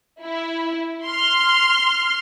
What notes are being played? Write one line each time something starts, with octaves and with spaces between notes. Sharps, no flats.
E4
C6 F6